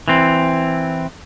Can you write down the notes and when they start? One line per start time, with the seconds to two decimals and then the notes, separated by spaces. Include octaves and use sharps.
0.08 E3 C4